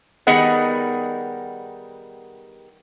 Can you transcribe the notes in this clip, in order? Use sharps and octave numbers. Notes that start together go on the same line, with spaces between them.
D#3 G3 B3 G#4 D#5 F#5